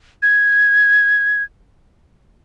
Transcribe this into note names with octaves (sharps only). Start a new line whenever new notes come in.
G#6